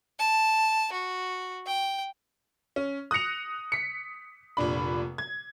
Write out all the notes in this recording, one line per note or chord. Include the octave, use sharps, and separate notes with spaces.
A5
F#4
G5
C#4
D#6 F#6 A#6 C#7 F7
B6 C#7
F1 A#2 D4 B5
G#6